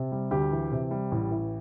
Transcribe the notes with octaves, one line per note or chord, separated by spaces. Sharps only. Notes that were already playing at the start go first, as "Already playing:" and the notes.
Already playing: C3
G3
D2 G4
E3
C3
G3
A1
E3